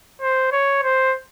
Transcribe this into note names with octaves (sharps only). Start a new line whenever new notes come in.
C5
C#5
C5